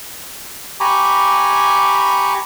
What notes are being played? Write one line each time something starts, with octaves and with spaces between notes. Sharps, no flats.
G4 G#5 A#5 B5 C#6 D6